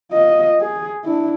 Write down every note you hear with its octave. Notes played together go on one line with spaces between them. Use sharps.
F4 D#5
G#4
D4 E4